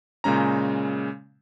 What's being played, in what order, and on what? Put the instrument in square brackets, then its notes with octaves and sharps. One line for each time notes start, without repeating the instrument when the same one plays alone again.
[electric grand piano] A#2 C#3 G#3 C#4 A#5